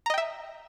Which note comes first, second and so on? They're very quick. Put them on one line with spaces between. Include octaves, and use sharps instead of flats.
A#5 D#5 G5 E5